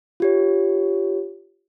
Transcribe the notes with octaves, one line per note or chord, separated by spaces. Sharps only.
F4 G4 C#5